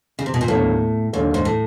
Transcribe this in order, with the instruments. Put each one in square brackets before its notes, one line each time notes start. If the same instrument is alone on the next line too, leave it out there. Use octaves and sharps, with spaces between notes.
[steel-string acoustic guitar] C#3
C3
B2
A#2
[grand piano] D#2 D3 F#3 A#3 [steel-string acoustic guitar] A2
[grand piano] D#2 D3 F#3 A#3 [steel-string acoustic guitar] G#2
[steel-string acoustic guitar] G#2
A2